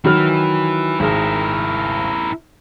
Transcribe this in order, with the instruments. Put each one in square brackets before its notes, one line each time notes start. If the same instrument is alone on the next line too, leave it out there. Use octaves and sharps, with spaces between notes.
[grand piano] D#3 F#3 F6 [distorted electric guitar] E4 B4
[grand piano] G#1 G#4 [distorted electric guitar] E4 A#4